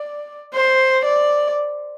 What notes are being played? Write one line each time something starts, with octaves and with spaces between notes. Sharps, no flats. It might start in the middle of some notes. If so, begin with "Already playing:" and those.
Already playing: D5
C5
D5